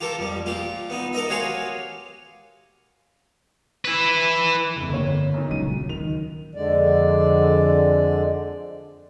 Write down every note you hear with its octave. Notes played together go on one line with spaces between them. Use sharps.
F4 G4 A4 A#4
F2 G3
A#2 F4 G4
B3 D#4
A4 A#4 D#5 E5
F#4 G4 C#5 F5 G#5 C6
E4 B4
F1 E2
G1 D3 A#3 C#5
B1 D#4
D#1 C#2 F#3 D#7
D#3 F7
F2 D3 G#3 D5